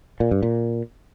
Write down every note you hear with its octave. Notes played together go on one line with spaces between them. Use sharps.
A#2
G2
A#2